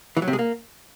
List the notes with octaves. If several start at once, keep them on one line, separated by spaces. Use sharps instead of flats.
E3
F#3
C3
G#3
A#3